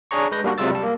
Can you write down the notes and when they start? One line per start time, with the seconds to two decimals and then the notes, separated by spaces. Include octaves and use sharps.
0.11 D4 G#4 C#5 A#5 C#6
0.32 G#3 B4 G6 A#6
0.44 G3 A#3 D4 F#4
0.58 C3 F#3 G#3 F4 E6 A6
0.71 G3 A5
0.83 A#3